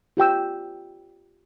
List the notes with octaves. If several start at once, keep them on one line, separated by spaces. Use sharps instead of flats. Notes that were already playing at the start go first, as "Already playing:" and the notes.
F4 G4 G5 E6